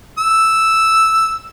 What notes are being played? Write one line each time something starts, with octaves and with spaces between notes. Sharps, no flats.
E6